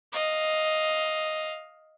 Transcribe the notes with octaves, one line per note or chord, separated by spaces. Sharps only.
D#5 F5